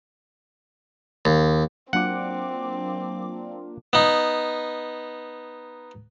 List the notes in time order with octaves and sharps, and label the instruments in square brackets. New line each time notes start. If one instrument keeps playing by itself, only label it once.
[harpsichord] D#2
[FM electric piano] F#3 D6 [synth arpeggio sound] A#3 D4 F4 [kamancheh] C4 [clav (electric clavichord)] F#5
[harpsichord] B3 D#4